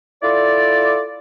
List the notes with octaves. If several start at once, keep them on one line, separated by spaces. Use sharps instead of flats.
E4 F4 A4 D5